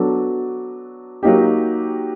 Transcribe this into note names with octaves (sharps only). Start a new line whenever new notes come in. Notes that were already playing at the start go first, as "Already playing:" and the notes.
Already playing: F#3 B3 D4 F#4 A4
F#3 A#3 D#4 G4